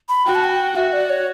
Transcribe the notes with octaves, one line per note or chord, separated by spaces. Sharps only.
B5
F#4 G5
A5
G5
F#4 E5
D5
C#5